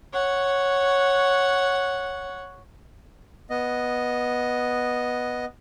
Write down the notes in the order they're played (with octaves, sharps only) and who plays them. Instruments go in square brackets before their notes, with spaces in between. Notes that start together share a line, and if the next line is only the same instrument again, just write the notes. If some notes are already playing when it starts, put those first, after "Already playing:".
[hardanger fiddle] C#5 F#5
[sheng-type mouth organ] B3 D#5